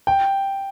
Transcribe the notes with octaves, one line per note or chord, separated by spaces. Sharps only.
G5